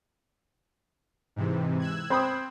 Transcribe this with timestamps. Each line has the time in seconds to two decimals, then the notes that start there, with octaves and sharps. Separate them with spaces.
1.36 G#2 C3 E3
1.80 E6 F#6 G#6
2.10 C4 B5 D#6